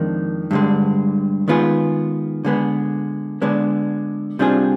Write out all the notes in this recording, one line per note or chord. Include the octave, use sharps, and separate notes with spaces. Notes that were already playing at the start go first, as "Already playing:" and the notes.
Already playing: F2 D#3 G#3 D4
G2 D3 G#3
D#3 G#3 B3 F4 G#4
D3 G#3 B3
D3 G#3 B3 D4
C3 G3 D4 F4 G#4